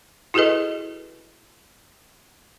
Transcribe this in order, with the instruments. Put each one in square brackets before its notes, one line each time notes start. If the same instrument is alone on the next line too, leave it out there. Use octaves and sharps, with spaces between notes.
[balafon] E4 F#4 G#4 A4 B4 D#5